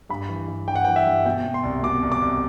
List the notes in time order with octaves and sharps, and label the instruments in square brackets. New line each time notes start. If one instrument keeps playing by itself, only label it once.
[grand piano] G2 B5
E3
G2
G2 G5
F#5
E3 G5
E5
G2
B2 G5
B2
C6
C2
B2 D6
C2
D6
C2